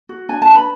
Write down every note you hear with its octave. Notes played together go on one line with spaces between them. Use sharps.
F#4
D4 G#5
A5
B4
B5